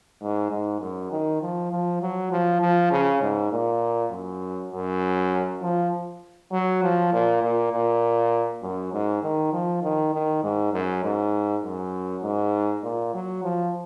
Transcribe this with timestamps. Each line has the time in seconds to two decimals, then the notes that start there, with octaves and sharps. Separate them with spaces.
0.22 G#2
0.51 G#2
0.81 F#2
1.11 D#3
1.42 F3
1.71 F3
2.01 F#3
2.32 F3
2.61 F3
2.91 C#3
3.22 G#2
3.52 A#2
4.12 F#2
4.72 F#2
5.62 F3
6.52 F#3
6.83 F3
7.13 A#2
7.42 A#2
7.72 A#2
8.63 F#2
8.93 G#2
9.23 D#3
9.53 F3
9.82 D#3
10.13 D#3
10.43 G#2
10.73 F#2
11.04 G#2
11.63 F#2
12.23 G#2
12.83 A#2
13.14 F#3
13.43 F3